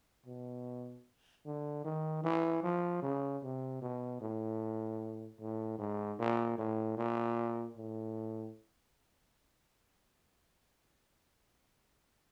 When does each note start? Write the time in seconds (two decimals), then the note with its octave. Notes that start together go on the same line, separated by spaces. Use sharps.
0.26 B2
1.45 D3
1.85 D#3
2.24 E3
2.63 F3
3.02 C#3
3.43 C3
3.82 B2
4.21 A2
5.40 A2
5.79 G#2
6.19 A#2
6.58 A2
6.97 A#2
7.77 A2